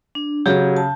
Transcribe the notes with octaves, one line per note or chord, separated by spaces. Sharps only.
D4
C#3 F#3 G4 G#4 G6
A5